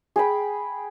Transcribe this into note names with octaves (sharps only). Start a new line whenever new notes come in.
G#4 G5 B5